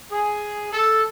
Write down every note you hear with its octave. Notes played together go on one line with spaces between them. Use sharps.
G#4
A4